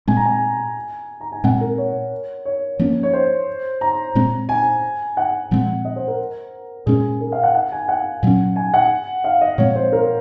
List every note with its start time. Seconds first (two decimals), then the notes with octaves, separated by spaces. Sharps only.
0.08 A#2 G#3 C4 G#5
0.17 A#5
0.25 G#5
1.21 A#5
1.32 G#5
1.44 A#2 G#3 C4 F#5
1.61 A#4
1.78 C#5
2.45 C#5
2.79 F3 A#3 C#4
3.03 C#5
3.13 C5
3.81 A#5
4.15 A#2 G#3 C4
4.49 G#5
5.17 F#5
5.51 A#2 F3 G#3 C4
5.85 D#5
5.96 C5
6.08 A#4
6.86 A#2 G#3 C#4 G#4
7.21 A#4
7.32 F5
7.43 F#5
7.55 F#5
7.72 G#5
7.89 F#5
8.23 A#2 F#3 C#4
8.56 G#5
8.74 F#5
9.24 F5
9.41 D#5
9.58 A#2 F3 G#3 C4 C#5
9.76 C5
9.92 A#4